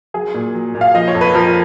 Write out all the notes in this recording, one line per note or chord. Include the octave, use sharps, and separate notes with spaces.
F#3 G#4
A#2
F#3
A#2
F5
F3 D#5
C#5
F2
B4
F3 A#4